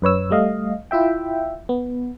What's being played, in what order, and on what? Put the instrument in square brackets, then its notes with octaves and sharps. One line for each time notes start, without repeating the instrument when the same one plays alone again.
[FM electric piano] F#2 B4 C#5 E6
G3 A3 D#5 F5
E4 F4 E5 G5
B3